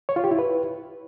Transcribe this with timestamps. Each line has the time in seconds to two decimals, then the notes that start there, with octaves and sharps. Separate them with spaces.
0.09 C#5
0.16 F4
0.24 G4
0.31 E4
0.39 B4